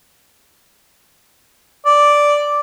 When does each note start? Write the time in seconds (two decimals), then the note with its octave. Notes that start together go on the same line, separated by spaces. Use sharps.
1.86 D5